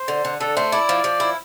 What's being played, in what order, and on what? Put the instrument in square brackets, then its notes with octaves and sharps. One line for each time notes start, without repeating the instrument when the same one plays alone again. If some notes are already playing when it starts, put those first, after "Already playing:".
Already playing: [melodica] C5
[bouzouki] D3
D3
[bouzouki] D3 [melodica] A4
[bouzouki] A3 [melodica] C5
[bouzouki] E4 [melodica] D5
[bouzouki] F3
F3
E4